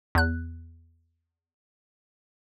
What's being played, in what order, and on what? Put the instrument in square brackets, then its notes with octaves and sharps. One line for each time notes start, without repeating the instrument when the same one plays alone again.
[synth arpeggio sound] E2 F#6